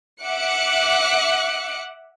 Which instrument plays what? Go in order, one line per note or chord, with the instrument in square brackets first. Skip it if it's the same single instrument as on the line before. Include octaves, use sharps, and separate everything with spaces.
[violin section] E5 F#5 D6 F#6 C#7